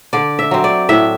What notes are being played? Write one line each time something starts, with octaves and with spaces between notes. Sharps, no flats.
D3 D5
E5
F#3 C4
D5
A2 E5